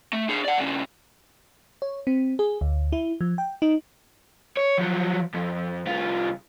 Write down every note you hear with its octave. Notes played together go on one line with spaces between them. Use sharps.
A3
D4 G#4
D5 F#5
G2 C#3
C#5
C4
G#4
D2
E4
F3
G5
D#4
C#5
F3 F#3
F2
C2 F4